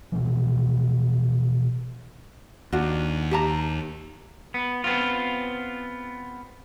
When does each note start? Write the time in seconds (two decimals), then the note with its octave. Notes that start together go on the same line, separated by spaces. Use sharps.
0.12 B2 E3 F3
2.72 D#2 D4 F4 F#4
3.31 G4 A5 A#5
4.54 B3
4.84 B3 C4 F4